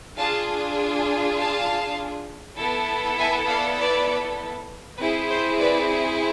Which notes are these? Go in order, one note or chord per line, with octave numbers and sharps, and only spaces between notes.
D4 F4 G#4 F5 A5
F5 A5
B3 E4 A4
E5 G#5
D5 F5
B4 D5
C4 E4 G#4 B4
C5
B4 D5